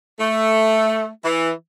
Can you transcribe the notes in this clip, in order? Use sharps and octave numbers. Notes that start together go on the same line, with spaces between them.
A3
E3